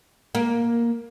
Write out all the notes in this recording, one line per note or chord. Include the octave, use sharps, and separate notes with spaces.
A#3